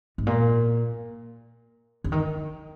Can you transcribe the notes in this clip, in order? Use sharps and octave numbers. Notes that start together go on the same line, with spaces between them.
G#2
A#2
D3
D#3